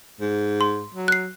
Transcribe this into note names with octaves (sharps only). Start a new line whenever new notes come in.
G#2
C6
F#3
F#6 C7